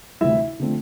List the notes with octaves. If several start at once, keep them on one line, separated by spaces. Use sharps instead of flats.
D2 C3 E3 G3 E4 E5
D3 F3 A3 C4